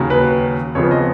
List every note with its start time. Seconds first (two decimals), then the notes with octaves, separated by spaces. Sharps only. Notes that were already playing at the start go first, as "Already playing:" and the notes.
Already playing: D#2 C#3 F#3
0.10 B4
0.75 F2 C#3 F3 B3 C#5
0.91 D#5